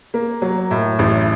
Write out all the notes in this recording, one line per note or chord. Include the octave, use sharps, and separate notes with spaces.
A#3
F#3
A2
A1